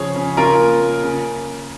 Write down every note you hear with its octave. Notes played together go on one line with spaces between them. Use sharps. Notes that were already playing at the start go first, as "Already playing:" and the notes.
Already playing: C#3 F3 G#4 C#5
C#3
C#3 F4 A#4
A#3
A#3
C#3